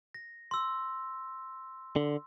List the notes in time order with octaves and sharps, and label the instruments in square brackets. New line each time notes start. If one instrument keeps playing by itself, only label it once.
[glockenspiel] A#6
C6 E6
[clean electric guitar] D3